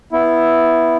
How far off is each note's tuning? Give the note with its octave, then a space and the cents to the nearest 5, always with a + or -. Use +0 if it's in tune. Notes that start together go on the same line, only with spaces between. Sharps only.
B3 +0 E4 +0 E5 +0